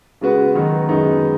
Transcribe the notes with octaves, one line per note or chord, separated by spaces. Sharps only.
C#3 G#3 B3 F#4 B4
D#3 F#3 B3 D#4 F#4
F#2 D#3 G#3 B3 D#4